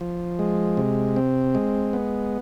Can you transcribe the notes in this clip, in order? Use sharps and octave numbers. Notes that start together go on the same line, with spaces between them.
F3
G#3
C3
C4
G#3
B3